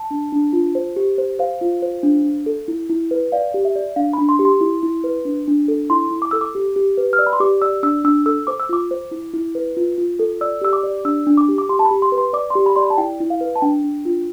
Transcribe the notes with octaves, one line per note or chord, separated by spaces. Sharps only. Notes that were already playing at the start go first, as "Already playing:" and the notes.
Already playing: A5
D4
D4
F4
C5
G4
C5
C5 F5
F4
C5
D4
D4
A4
E4
E4
B4
D5 F5
G4
E5
D5
D4 F5
D4 B5
C6
G4
C6
E4
E4
B4
D4
D4
A4
E4 C6
E4
D6
A4 E6
D6
G4
G4
B4
F6
D5 E6
B5
C6
G4 D6
D5 E6
D4 E6
D4 E6
A4 E6
C5 D6
E6
F4 D6
C5
E4
E4
B4
F4
F4
A4
D5 E6
G4 E6
D6
D5
D4 E6
D4
D6
G4
D6
G4 C6
A5
B5
G4
C6
B4
C6
D5 D6
G4 C6
B5
D5 C6
B5
A5
E4 G5
E4
F5
B4
A5
D4 G5
D4
F4